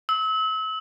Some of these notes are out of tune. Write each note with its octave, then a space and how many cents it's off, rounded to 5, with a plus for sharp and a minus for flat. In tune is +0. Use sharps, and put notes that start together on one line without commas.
E6 -35